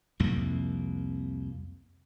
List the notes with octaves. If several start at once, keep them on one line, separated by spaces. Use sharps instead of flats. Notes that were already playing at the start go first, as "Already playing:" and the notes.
C2 F2 C3 A#3